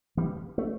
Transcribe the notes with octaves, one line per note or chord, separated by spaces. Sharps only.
E3 G3
A3